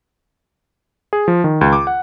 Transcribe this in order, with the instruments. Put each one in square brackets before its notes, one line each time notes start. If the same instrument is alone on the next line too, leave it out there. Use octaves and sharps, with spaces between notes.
[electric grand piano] G#4
F3
D#3
C#2
D6
F#5